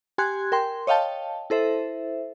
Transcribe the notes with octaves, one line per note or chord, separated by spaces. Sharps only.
G4 G#5 C6 F#6 G#6
A#4 G5 C6
C#5 D#5 F5 G5 A5
E4 A4 C5 E5